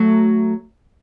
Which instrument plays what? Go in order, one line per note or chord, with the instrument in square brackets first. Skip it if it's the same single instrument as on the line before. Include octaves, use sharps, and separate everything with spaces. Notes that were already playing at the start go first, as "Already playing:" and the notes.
Already playing: [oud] F#3 A3